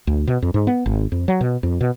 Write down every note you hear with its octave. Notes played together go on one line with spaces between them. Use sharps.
D2
B2
F2
G#2
B3
G#1
F2
F#3
B2
F2
B2